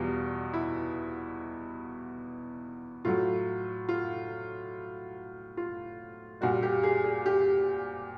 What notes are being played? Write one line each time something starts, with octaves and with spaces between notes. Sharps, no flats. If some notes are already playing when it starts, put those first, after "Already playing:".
Already playing: E2 B2 G3 F4
E4
A2 F#3 F4
F4
F4
A#2 G3 F#4
G4
G#4
G#4
G4